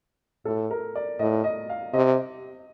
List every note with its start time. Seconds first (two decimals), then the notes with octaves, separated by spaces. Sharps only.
0.45 A2 A4
0.71 A#4
0.96 D5
1.19 A2 D#5
1.44 D#5
1.69 F5
1.93 C3 D#5